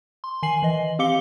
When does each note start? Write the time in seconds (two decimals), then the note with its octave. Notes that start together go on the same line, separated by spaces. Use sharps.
0.24 C6
0.43 D#3 G#5 C7 F#7
0.63 E3 D#5
0.99 C4 G4 F5 D6 C#7 G7